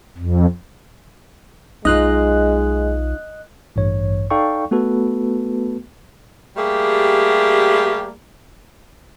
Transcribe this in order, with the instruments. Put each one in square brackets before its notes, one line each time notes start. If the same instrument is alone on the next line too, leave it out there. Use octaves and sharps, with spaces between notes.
[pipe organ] F2
[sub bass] B1 [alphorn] G#3 [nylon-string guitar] D#4 F4 [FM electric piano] D#5 F#6
[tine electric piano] A1 G2 C#5
D#4 A4 D5 F5 G5 C#6
A3 B3 F#4 A4 B4
[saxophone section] G3 A3 A#3 G4 G#4